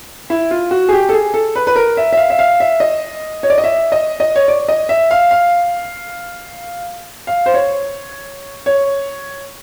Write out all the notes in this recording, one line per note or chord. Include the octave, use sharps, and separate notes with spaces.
E4
F4
F#4
G#4
G4
A4
G#4
A4
B4
B4
A#4
E5
E5
F5
E5
F5
E5
D#5
C#5
D5
D#5
E5
D#5
D#5
C#5
D5
D#5
E5
F5
F5
F5
C5
C#5
C#5